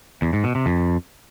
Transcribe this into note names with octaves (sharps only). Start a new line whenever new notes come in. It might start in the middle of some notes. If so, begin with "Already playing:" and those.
E2
G#2
B2
C3
F2